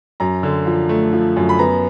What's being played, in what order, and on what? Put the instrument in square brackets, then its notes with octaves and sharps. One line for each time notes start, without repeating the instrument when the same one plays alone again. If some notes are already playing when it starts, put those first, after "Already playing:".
[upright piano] F#2 A#5
D3
F3
A3
F3
F#2
B5
B3 A#5